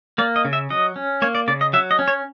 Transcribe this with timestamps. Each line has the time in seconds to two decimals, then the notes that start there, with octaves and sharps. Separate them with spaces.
0.18 A#3 D5
0.36 D#5
0.45 C#3
0.53 E5
0.70 F#3 D#5
0.96 C#4
1.22 A#3 C#5
1.35 D5
1.48 C#3 D5
1.61 D#5
1.73 F#3 E5
1.91 D#5
1.99 C#4
2.08 C#5